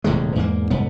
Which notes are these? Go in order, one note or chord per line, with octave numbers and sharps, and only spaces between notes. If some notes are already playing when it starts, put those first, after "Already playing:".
D#1 A2 C3 G#3
E2 G#2 G#3 A#3
C2 F2 G#2 B3